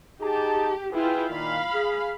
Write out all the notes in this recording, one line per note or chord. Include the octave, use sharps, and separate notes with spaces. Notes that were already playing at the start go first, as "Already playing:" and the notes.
D#4 G4 G#4 A5
E4 F4 G#4 B4 G5
A#2 D#3 F5 B5
G#4